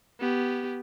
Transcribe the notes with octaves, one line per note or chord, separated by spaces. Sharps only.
B3 G4